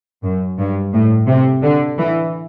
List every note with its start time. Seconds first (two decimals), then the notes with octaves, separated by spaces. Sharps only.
0.23 F#2
0.58 G2
0.93 A2
1.28 C3
1.63 D3
1.98 E3